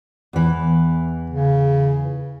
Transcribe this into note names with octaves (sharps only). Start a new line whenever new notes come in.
E2 E3
C#3